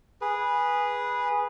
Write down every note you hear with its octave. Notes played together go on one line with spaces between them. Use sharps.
G#4 B4